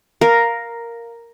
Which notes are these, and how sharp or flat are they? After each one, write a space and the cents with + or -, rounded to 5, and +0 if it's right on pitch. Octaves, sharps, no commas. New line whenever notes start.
A#4 +0 F5 +0